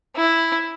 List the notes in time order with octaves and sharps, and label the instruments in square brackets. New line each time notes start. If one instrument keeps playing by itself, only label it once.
[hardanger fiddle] E4